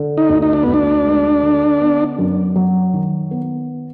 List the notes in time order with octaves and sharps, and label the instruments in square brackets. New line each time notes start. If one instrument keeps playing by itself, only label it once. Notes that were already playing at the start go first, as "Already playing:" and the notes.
Already playing: [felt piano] D3
[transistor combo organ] D#4
[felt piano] D2
[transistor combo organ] D#4
D4
[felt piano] D2 [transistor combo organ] B3
[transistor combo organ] D4
[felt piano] G#3
D3
B3
F#2
F#3
D#3
B3